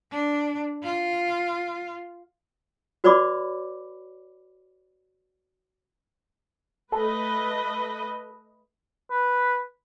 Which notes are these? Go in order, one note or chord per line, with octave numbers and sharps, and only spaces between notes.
D4
F4
F#4 B4 C#5 D5 B5 D6
A3 A4 B4 D#5
B4